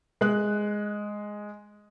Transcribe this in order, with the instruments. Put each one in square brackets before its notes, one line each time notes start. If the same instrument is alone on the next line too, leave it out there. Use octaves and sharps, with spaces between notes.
[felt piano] G#3 F#6